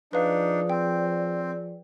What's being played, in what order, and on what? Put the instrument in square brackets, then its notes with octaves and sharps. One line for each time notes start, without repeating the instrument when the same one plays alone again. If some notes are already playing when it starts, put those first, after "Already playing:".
[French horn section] F3 G#4 D5 [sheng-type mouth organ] D4 D#4 [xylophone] B4 F5
[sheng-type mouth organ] C4 [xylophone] G5